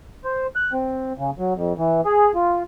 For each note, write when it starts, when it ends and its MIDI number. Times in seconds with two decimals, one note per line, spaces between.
0.24 0.47 72
0.56 0.72 90
0.73 1.13 60
1.18 1.30 49
1.39 1.54 54
1.55 1.73 41
1.78 2.01 52
2.05 2.32 68
2.35 2.63 65